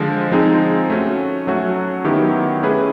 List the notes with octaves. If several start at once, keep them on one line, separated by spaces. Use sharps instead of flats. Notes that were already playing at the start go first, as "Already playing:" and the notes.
Already playing: D3 F3 G#3
F3 G#3 C4 D#4 G#4
A3 C#4 F#4
F#3 A3 C#4 F#4
D#3 F#3 B3 E4 G4
A3 C#4 E4 G#4 B4